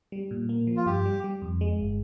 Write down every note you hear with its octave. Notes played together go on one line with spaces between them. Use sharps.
G3
A#2
A#3
F3
F4
G2 G4
G3
G3
F2
G#3
G1